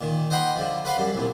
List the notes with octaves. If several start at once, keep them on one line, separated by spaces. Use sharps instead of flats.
A#2 D#3
C5 D#5 F#5 G5 B5 C6
D3 F3
B4 C5 F5 F#5 B5 C6
F#2 G3
C2 A#2